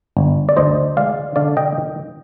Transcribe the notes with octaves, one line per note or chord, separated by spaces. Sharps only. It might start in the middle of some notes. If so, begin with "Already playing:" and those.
G1
D5
D2 C5 D#5
G#3 D5 F5
D3 D5 F5
D#5 G5